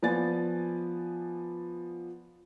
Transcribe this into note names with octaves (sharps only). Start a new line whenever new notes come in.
F3 B3 D5 G#5 A6